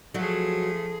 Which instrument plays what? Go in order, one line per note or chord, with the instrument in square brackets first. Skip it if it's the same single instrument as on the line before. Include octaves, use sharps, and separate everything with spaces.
[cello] F3 G#4 [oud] F#3 F#4 [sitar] A3